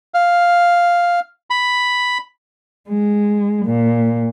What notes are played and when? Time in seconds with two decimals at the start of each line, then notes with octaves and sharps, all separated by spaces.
0.14 F5
1.50 B5
2.89 G#3
3.66 A#2